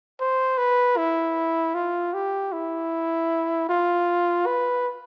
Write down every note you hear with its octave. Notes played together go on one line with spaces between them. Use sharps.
C5
B4
E4
F4
G4
E4
F4
B4